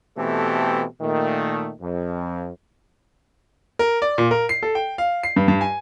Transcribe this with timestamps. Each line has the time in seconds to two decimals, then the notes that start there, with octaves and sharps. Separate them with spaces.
0.17 B2 E3 A3 C4 G4 A4
1.00 A#2 D#3 A3
1.80 F2
3.79 A#4
4.02 D5
4.18 A#2
4.31 A#4
4.49 C7
4.63 A4
4.75 G5
4.98 F5
5.23 C7
5.36 G2
5.48 G2
5.61 G#5